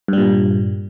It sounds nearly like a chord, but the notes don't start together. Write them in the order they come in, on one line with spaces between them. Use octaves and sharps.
G2 G3 A#2